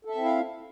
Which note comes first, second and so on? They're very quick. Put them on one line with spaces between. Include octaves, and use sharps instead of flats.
A4 E5 C4 E4 F5